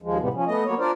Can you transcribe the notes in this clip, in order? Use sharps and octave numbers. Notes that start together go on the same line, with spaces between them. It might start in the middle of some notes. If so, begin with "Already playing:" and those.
D#2 F3 G#3
A2 C3 G3 B3
F3 C#4
A3 B3 D#5
F#3 A#3 B3 C#5
D4 F4 A#4 C5 D5